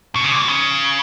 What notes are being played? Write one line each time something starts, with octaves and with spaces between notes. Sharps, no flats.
B2
C#3
A#2
B2
C#3